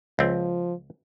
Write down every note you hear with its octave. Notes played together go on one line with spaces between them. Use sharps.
C#2 F3 C4